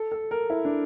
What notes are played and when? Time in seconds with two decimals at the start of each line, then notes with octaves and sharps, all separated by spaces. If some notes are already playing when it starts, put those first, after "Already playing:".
Already playing: A4
0.12 A4
0.31 A#4
0.50 E4
0.65 D4